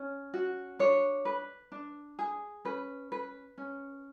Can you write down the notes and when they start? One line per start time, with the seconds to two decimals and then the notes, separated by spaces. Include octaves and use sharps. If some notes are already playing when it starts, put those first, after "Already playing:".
Already playing: C#4
0.34 F#4
0.79 D4 C#5
1.25 B4
1.72 D4
2.19 G#4
2.65 C#4 B4
3.12 B4
3.58 C#4